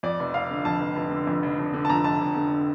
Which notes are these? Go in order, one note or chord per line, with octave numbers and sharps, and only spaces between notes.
F2 D5
F1
F1 F5
D3
F2 A5
F1
F1
D3
F2
F1
F1
D3
A5
F2 A#5
F1 A5
F1
D3